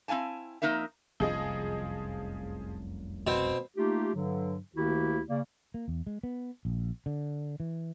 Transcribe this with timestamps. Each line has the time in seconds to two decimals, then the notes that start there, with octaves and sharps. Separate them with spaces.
0.08 C4 E4 F5 G#5 A5
0.62 F2 E3 A#3 D#4 A#4 E5
1.20 F1 C2 F#2 F3 G#4 D#5
3.27 B2 C4
3.77 A3 A#3 D#4 F4 G4
4.14 G2 D3 F#3
4.76 D2 D#3 A#3 E4 F#4 G4
5.29 C#3 A#3 D5
5.74 A#3
5.88 E2
6.07 G#3
6.23 B3
6.65 A#1
7.06 D3
7.60 E3